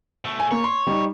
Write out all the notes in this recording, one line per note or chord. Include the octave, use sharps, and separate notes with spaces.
B2 A3
G#5
A#3 C#5
C6
G3 D#4